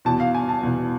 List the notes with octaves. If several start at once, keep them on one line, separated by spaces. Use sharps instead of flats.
E2 B2 A5
F5
G#5
A5
E2 B2